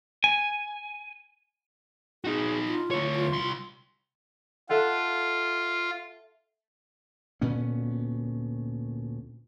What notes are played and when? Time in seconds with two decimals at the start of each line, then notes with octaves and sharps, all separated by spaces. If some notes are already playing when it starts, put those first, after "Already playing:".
0.24 G#5
2.25 D#4 F#4 G#4
2.68 F4
2.91 D2 C#5
3.15 F4
3.33 C2 C6
4.69 F4 A4 E5 F#5
7.41 D2 A#2 B3 C#4